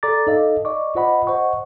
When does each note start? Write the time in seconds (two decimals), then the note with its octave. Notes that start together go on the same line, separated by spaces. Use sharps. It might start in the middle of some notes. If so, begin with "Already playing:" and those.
0.03 A4 D5 A#5 D6 A6
0.27 D#4 A4 D#5 F5
0.65 D5 D#5 C#6 D6
0.95 F4 C5 D#5 F#5 B5
1.27 C5 D#5 F#5 C#6